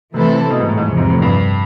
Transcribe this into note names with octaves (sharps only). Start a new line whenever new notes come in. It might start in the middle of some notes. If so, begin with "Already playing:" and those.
C3 E3 A3 C4 E4 A4
B2
G#2
A2
G#2
E2 C3 F3
G#2
A2
G2